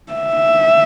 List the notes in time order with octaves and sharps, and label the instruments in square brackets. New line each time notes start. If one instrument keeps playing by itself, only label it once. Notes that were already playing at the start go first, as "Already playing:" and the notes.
[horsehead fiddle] E5